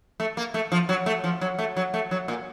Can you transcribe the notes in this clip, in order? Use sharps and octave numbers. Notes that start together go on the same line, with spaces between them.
A3
A#3
A3
F3
F#3
A3
F3
F#3
A3
F#3
A3
F#3
A#2